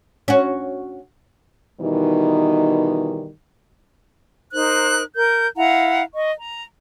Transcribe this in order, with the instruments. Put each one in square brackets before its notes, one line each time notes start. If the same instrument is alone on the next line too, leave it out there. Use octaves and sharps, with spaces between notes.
[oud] C#4 F#4
[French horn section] B2 D#3 E3 G3 D#4
[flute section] D#4 A#4 C5 F#6
A#4 G6
E4 F5 F#5 A#5
D#5 C#6
A#5